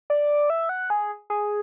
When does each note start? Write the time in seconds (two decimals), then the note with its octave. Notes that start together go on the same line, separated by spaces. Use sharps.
0.10 D5
0.50 E5
0.69 F#5
0.90 G#4
1.30 G#4